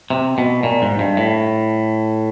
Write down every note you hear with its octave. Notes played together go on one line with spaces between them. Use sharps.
C3
B2
A#2
G#2
G2
A2